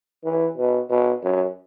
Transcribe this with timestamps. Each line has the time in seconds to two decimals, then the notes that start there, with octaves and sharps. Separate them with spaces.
0.24 E3
0.57 B2
0.90 B2
1.23 F#2